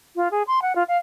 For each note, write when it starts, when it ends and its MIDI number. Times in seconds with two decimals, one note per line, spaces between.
0.16 0.28 65
0.31 0.43 68
0.47 0.59 84
0.62 0.73 78
0.75 0.83 65
0.88 0.97 77